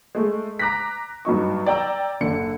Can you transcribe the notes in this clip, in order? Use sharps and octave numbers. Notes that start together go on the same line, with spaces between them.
G#3 A3
A#5 D6 F#6 A#6 B6
G2 F#3 D#4 C#6
D5 G5 A#5 E6
F#1 D3 C#7